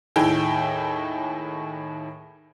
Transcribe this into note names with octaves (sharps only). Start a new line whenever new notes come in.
D#2 A2 D#4 E4 G#4 G5